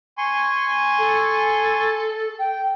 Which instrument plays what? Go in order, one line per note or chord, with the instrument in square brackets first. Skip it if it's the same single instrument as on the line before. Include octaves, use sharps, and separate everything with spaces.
[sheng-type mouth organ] G#5 C6 C#6
[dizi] A4
G5